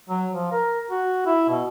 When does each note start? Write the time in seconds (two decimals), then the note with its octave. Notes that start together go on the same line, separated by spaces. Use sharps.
0.09 F#3
0.32 F3
0.52 A#4
0.91 F#4
1.26 E4
1.50 B2